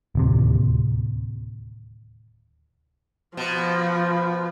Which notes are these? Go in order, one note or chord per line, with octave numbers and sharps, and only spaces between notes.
D1 D#2 C3
B2 F3